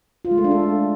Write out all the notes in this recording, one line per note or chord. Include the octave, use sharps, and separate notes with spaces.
F4
G#3
A3
D4
A4